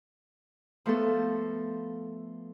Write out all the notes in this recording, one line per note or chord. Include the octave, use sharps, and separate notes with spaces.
F3 A3 B3 A4